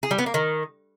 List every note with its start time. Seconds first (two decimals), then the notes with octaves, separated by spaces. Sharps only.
0.03 G#4
0.11 G3
0.19 B3
0.26 A#3
0.34 D#3